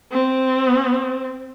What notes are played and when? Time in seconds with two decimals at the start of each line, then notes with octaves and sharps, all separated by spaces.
0.12 C4